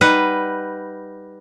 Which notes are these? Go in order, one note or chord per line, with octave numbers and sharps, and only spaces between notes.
G3 D#4 B4 F#5